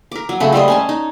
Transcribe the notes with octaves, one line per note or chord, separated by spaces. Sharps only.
A#4 D6
F#3
C#3 A3 B5
G3 A3 C5 D#5
C#4 G#5 A5
D#4